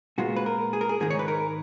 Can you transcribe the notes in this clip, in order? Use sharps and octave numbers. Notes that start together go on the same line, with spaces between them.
A#2 G#3 B3 F4 F#4
B4
A#4
G#4
A#4
G#4
G#2 D#3 G#3 D#4 G#4
C#5
B4
A#4